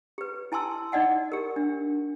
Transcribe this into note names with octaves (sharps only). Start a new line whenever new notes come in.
G4 B4
E4 G#5 A5 C6 E6
D#4 D5 D#5 F#5 G#5
G4 A#4
D4